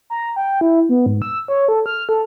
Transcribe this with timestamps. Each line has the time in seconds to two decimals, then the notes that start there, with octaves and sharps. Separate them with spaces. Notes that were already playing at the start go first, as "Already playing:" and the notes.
0.10 A#5
0.36 G5
0.61 E4
0.89 B3
1.06 G#2
1.22 E6
1.48 C#5
1.68 A4
1.86 F6
2.09 A4